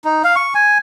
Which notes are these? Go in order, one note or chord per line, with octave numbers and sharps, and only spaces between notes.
D#4
F5
C#6
G#5